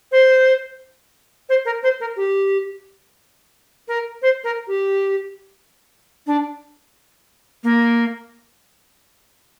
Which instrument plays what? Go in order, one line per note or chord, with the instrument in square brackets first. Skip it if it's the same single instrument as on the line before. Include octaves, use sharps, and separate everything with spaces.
[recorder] C5
C5
A#4
C5
A#4
G4
A#4
C5
A#4
G4
D4
A#3